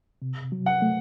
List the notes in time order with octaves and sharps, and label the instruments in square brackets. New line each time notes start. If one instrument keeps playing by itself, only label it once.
[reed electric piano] C3
F#3
[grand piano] F#5
[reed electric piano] A3